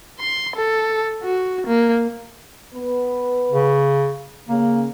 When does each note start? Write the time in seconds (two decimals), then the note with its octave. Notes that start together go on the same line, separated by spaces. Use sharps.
0.20 C6
0.56 A4
1.23 F#4
1.67 A#3
2.73 B3 B4
3.51 C#3
4.49 C#3 A#3